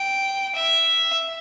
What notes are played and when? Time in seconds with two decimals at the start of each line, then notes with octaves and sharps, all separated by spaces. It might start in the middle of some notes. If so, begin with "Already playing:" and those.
Already playing: G5
0.55 E5